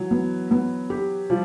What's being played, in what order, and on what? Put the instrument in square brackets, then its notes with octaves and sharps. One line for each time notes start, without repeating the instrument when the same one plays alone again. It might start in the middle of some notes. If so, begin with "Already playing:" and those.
Already playing: [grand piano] E3 F#3
[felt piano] B3
B3
G4
[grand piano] F3 G3